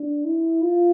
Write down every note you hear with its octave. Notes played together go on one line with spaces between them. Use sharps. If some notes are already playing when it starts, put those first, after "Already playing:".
Already playing: D4
E4
F4